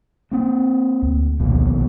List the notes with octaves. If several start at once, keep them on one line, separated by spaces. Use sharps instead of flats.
A#3 C4
D2
A#1 D#2 B2